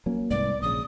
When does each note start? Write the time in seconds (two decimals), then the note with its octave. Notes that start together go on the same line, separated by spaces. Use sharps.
0.06 F#3 A#3 C#4
0.30 C2 G#2 B3 D5
0.62 A#1 C#3 D#6